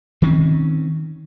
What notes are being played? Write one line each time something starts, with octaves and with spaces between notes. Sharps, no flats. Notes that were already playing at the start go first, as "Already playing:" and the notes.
D#3 C4 C#4